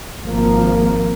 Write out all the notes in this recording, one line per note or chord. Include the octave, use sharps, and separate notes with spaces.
G#1 F3 A#3